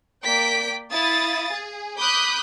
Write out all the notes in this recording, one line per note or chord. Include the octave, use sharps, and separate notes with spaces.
A#3 D5 G5 B6 D7
E4 F5 D#6 A6
G#4
B5 D6 D#6 F#6 G6 B6